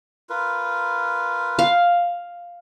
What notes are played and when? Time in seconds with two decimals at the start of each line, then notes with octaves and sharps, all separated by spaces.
0.29 F4 A#4 B4
1.59 F5